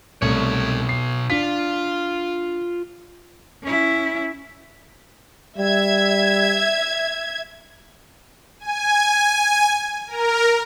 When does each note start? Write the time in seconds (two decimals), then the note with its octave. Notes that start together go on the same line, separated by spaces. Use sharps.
0.22 C2 B2 A3 C#5
0.89 C7
1.30 D4 F4 B6
3.63 C#4 E4
5.58 G3 E5 G#6
8.60 G#5
10.07 A#4